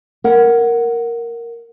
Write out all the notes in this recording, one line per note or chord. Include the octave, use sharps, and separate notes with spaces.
A#4 F#5